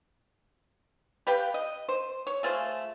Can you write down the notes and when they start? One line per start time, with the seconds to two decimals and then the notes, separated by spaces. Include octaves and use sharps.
1.27 G4 B4 F5 G5
1.54 D#5
1.88 C5
2.27 C#5
2.43 A3 F4 G#4 C5